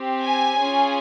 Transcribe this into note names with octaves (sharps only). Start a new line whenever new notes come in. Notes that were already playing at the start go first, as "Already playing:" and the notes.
Already playing: C4 G4
G#5
C#4 F4 G#4